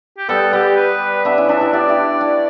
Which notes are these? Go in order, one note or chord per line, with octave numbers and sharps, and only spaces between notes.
G4
G3 B3 A4
G3 B3 G4
B4
B3 D4 E5
C#4 E4
D4 F#4 E5
E4 G4
E4 G4 D5
E4 G4
D4 F#4